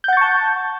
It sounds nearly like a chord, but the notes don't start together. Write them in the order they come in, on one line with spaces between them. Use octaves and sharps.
G6 F#5 A6 C#6 A5